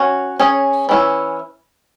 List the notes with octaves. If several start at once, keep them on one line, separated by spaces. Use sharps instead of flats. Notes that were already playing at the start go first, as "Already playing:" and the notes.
Already playing: C#4 F#4 C#5
C#4 G#4 C#5
E3 C#4 E4 C#5